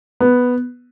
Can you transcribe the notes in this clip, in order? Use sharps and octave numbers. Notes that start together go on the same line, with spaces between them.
B3